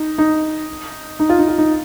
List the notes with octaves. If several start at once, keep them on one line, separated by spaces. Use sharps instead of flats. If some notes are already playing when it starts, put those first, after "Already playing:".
Already playing: D#4
D#4
D#4
F4
D#4
F4
D#4